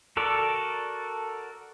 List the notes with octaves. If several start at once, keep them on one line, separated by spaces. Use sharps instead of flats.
F#4 A4 A#4 D5